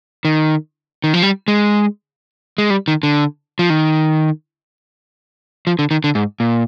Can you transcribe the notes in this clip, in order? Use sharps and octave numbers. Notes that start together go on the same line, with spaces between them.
D#3
D#3
F3
G3
G#3
G#3
G3
D#3
D3
F3
D#3
F3
D3
D#3
D3
G#2
A#2